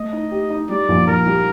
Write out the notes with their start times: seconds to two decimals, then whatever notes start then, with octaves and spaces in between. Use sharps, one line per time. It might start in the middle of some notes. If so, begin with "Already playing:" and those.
Already playing: A3 D#5
0.12 D#4
0.31 G4
0.50 D#4
0.69 G3 D5
0.88 A#1
1.07 A#1 A#4
1.27 G3